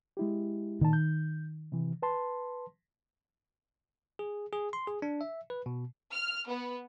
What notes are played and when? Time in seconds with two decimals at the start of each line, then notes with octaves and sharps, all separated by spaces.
0.17 G#3 E4 G4
0.81 A#2 D#3 A5
0.93 G6
1.72 C3 E3
2.02 B4 A5 C6
4.19 G#4
4.53 G#4
4.73 C6
4.88 G#4
5.02 D4
5.21 E5
5.50 B4
5.66 B2
6.14 F6
6.50 B3